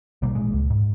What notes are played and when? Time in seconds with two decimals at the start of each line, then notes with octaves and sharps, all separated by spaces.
0.22 A#1 B2 G3 A#3
0.35 A1 G#3
0.53 C#2
0.70 G#2